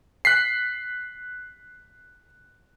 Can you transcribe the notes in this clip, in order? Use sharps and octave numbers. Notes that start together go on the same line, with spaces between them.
F#6 B6 C7